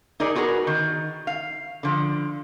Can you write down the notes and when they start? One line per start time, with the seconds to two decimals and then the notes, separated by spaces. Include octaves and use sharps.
0.20 D#4 G#4 A#4 D5
0.35 B3 F#4 G#4 A#4
0.67 D#3
1.27 F5
1.83 D3 F3